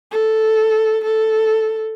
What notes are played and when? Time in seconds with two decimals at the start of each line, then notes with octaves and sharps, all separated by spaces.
0.11 A4
1.05 A4